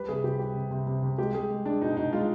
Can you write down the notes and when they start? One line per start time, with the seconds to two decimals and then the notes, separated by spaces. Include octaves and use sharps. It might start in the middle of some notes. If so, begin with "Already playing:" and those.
Already playing: G3 B4
0.08 C3 G#4
0.24 C3 G4
0.39 G3 G4
0.55 C3
0.71 C3
0.87 C3
1.03 C3
1.18 G#3 G4
1.34 G#3 G#4
1.50 G#3
1.65 G#3 D4
1.82 B2 D#4
1.97 B2 D#4
2.13 G#3 F4